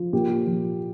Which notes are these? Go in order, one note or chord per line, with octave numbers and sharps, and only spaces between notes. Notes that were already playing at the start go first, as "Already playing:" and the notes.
Already playing: F3
A#2 G4
F3